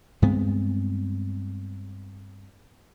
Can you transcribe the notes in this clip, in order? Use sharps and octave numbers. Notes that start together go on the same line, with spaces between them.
G2 G#3 B3 C4